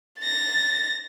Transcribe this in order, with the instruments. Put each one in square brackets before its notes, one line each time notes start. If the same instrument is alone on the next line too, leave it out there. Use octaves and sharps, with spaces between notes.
[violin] A6 A#6